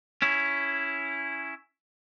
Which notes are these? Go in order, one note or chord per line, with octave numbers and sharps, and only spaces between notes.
C#4 E4